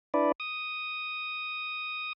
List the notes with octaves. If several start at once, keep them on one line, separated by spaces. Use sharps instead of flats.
D4 E4 B4 D5
D#6